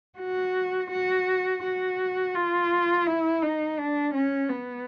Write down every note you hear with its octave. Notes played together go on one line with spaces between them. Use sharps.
F#4
F#4
F#4
F4
E4
D#4
D4
C#4
B3